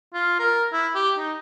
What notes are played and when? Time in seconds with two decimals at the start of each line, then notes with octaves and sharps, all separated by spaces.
0.14 F4
0.39 A#4
0.73 E4
0.95 G4
1.18 D#4